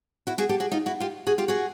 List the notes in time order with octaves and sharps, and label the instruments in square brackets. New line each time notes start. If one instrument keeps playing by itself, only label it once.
[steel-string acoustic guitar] E4 F#4
F#4 G#4
G4 A4
F#4 G#4
D#4 F4
E4 F#4
F4 G4
F#4 G#4
F4 G4
F#4 G#4